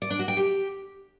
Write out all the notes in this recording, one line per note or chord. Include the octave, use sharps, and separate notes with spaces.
D5
D4
F#4
G5
G4